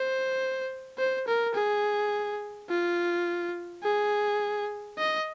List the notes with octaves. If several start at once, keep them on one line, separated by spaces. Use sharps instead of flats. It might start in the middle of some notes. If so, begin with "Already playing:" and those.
Already playing: C5
C5
A#4
G#4
F4
G#4
D#5